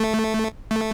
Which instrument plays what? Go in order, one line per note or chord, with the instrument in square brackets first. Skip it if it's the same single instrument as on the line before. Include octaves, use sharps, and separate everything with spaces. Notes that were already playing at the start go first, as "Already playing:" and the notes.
Already playing: [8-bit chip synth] A3
A3